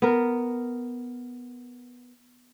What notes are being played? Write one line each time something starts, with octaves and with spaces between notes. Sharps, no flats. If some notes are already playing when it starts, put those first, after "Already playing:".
B3 A#4